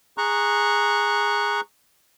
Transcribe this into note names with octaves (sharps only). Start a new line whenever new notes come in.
G#4 A#5 C#6 F#6